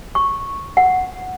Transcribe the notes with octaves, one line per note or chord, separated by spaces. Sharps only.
C#6
F#5